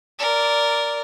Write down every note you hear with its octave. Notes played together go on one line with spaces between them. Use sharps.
A#4 D5